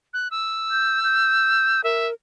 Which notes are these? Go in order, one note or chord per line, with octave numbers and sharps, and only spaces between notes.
F#6
E6
G6
G6
A#4 E5